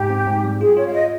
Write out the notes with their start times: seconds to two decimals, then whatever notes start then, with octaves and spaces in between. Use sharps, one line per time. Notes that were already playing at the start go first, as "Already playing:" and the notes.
Already playing: G#2 G4
0.10 C4
0.27 G#2
0.44 G3
0.60 F4 G#4
0.77 F4 C#5
0.86 F5
0.93 F4 D#5